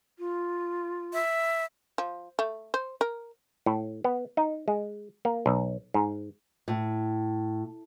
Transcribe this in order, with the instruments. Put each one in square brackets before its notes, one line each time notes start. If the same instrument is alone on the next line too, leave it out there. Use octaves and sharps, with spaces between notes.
[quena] F4
[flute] E5
[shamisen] F3
A3
C5
A#4
[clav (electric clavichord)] A2
B3
D#4
G#3
A#3
B1
G#2
[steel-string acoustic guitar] A2